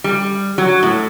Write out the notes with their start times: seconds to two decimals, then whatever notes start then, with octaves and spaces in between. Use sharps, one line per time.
0.04 G3
0.58 F#3
0.83 A2